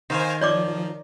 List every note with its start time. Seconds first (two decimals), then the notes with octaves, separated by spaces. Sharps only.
0.10 D#3 C5 F5 G#5
0.41 F3 C#5 D5 D6